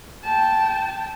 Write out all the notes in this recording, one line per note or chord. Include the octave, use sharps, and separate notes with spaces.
G5 A5